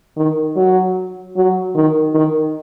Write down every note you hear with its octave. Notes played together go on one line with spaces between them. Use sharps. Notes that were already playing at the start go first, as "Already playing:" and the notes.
D#3
F#3
F#3
D#3
D#3